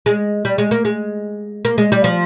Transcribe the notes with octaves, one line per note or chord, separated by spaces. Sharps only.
G#3
G3
G#3
A#3
G#3
A#3
G#3
G3
F3